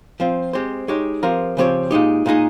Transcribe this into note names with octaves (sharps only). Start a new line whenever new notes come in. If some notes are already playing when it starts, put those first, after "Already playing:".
F3 C4 F4
G#3 C4 G4 C5
G#3 D#4 G4 C#5
F3 C4 G4 A#4
C#3 F3 C4 G4 C#5
A#2 G#3 D#4 G4
A#2 G#3 D#4 G#4